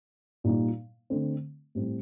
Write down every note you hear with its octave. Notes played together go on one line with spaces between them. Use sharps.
A#2 G3 A#3 D#4
D3 A3 C4
A2 G3 C4